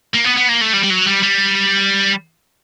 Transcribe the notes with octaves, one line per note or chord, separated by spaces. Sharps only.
A#3
B3
B3
A#3
A3
G3
G3
F#3
G3
G3